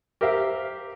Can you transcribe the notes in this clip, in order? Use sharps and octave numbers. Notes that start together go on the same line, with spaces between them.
G4 A#4 C5 E5 F5